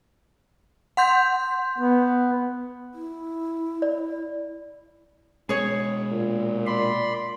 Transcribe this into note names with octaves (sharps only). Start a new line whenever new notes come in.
F#5 C6 G6
B3
E4
D5
B2 G#3 G#4 C#5
A#2
D5 B5 C6